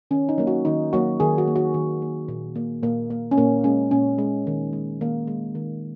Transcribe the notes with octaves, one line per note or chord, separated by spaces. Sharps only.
D#3 C#4
D#4
F#3 A#3
F#4
D#3 D#4
F#3 A#3 F#4
D#3 G#4
F#4
A#3
F#4
D#3
A#3
A#2
A#3
A#2 A#3
A#3
C#4
A#2 A#3
G#3 C#4
A#2 C#4
G#3
D#3
G#3
D#3 A#3
G#3
D#3